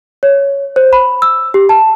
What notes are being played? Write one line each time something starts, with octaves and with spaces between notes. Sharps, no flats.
C#5
C5
B5
E6
G4
A5